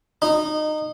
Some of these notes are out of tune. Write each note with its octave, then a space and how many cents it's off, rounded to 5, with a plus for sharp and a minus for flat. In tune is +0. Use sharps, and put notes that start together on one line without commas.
D#4 -20